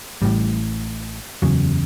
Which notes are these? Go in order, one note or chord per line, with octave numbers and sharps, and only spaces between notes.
A1 A2 G3
F#1 E2 C#3 F#3